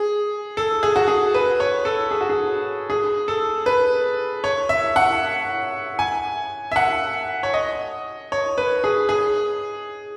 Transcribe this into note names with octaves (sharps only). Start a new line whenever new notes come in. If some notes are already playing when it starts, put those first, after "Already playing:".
Already playing: G#4
A4
G#4
F#4
G#4
B4
C#5
A4
G#4
F#4
G#4
G#4
A4
B4
C#5
E5
F#5
G#5
E5
F#5
C#5
D#5
C#5
B4
G#4
G#4